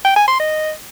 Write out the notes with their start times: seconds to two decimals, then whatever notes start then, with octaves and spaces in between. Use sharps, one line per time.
0.05 G5
0.16 G#5
0.28 C6
0.40 D#5